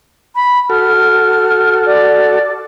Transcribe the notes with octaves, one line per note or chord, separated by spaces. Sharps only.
B5
F#4 A4 F6
D5